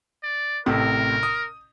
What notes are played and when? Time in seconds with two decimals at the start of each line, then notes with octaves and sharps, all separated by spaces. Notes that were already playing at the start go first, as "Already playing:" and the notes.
0.24 D5
0.66 A1 A2 C3 A#4
1.23 D#6